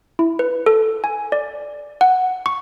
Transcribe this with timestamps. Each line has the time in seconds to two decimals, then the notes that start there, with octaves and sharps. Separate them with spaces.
0.19 E4
0.39 B4
0.66 A4
1.04 G#5
1.32 D5
2.01 F#5
2.46 C#6